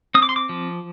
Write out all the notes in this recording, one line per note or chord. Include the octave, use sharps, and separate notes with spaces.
C4 D#6
D6
C6
D6
F3